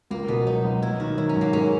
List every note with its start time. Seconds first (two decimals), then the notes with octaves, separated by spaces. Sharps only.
0.11 C#2 A#3
0.28 B2 B3
0.46 F#3 D#4
0.65 C#2
0.82 A#3 E4
1.00 D#3 F#4
1.17 F#3 E4
1.29 C#4
1.36 G#2
1.41 A#3
1.53 G#3 C#4